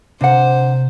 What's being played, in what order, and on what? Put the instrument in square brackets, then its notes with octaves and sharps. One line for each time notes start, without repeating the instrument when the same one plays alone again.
[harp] C3 [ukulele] D4 F#5 [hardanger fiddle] C5